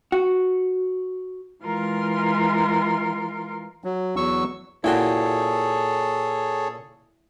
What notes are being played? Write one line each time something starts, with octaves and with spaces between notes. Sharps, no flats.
F#4
E3 G#3 F4 A#4 C6
F#3
E2 F#3 C#6 E6
A#2 E4 F#4 G#4 A4 C#5 G5 C6